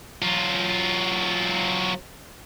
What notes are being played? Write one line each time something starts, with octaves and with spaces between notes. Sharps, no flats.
F#3 F4